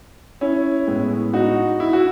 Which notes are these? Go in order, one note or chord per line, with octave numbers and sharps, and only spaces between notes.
C#4 E4
A2 G#3 B3
D#4 F#4
E4
F#4